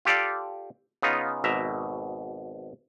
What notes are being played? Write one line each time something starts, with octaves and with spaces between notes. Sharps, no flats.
F4 G4 A4 D5 F5
C#3 B3 D#4 F4
G#1 B2 E5 A#5